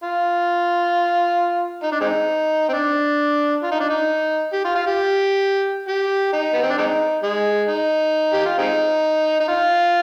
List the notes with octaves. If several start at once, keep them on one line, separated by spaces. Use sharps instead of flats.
F4
D#4
D4
G#3 C4 D#4
C4
D4
F4
D#4
D4
D#4
G4
F4
F4
G4
G4
D#4
B3
C4
D4
G#3 C4 D#4
G#3
D#4
G4
F4
G#3 C4 D#4
D#4
F4